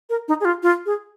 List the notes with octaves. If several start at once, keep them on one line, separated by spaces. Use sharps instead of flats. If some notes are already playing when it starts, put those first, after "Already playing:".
A#4
D#4
G#4
F4
F4
G#4